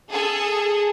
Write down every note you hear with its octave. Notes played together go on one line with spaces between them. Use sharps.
G#4 A4